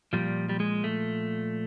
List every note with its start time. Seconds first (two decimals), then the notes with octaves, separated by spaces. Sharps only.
0.13 A#2 F3 G3
0.49 G3
0.60 G#3
0.84 A3